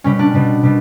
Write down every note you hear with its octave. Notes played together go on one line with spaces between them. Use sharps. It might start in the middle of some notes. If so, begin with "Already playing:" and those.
B2 G3 C#4
D4
B2 G3
B2 G3